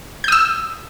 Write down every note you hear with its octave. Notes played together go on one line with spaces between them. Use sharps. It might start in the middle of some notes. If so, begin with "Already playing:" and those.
D#6 E6 G6